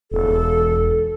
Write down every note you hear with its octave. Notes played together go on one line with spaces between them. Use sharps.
E1 A4